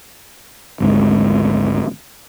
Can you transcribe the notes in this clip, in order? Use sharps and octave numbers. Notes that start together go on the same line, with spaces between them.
G#1 D2 G#2